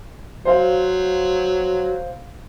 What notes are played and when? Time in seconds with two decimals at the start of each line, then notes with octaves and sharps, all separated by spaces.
0.45 F#3 C5 F5